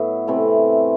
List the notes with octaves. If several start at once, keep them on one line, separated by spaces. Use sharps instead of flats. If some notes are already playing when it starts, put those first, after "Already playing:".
Already playing: A2 F#3 B3 E4
C3 E3 A3